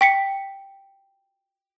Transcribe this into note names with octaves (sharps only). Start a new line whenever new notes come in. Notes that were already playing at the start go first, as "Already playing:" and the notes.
G5 B6 C#7